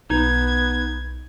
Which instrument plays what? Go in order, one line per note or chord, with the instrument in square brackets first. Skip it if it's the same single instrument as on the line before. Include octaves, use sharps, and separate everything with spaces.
[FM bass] B1 [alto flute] B3 [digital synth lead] D#4 [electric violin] G#6